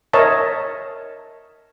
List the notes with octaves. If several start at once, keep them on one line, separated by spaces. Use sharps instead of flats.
A#4 C#5 D#5 E5 A5